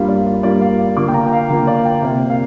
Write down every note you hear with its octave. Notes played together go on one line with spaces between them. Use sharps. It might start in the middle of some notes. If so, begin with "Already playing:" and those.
Already playing: G2 G3 A#3 F4 F5
D5
D5
G2 G3 A#3 F4 D5
F5
D3 A#3 F4 D6
G5
A#5
G5
F5
D3 A#3 F4 F5
D5
G5
C3 A#3 F4
F5